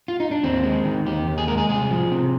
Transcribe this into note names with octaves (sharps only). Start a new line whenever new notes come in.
F4
D#4
D4
D#2 C4
G#3
D#3
D#2 G4
D#2
G#4
G#3 A#4
G#4
C2 G#4
F3
C3